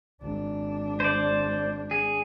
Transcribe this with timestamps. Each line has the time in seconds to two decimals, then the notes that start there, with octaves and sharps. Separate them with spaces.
0.22 G#1 D4
1.00 C5 D5
1.91 G#4